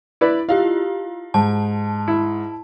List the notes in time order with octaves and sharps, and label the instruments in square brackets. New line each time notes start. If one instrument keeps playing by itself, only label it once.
[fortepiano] E4 B4 D5
[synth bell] E4 F4 G4 [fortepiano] F5
[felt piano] G#2 [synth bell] A5
[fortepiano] E4